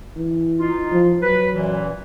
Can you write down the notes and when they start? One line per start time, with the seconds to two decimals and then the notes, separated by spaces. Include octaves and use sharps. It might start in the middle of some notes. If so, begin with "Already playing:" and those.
0.16 E3
0.59 D#4 F4
0.92 F3
1.22 F#3 B4
1.54 F#2 A#2 E3